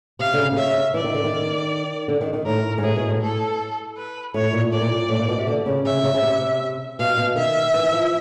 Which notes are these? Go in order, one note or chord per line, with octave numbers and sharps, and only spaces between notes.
C3 F5
D3
C#3
C3
C#3 E5
E3 D5
D#3
D3
D#3
D3
D#3
D#3
A2 A#4
G#2
A2 G#4
B2
A2
A4
B4
A2 C#5
A#2
A2 D5
A#2
A#2
A2
A#2
B2
C3
D3
C#3
C#3 E5
C#3
C#3
C3
B2 F5
B2
D#3 E5
E3
F3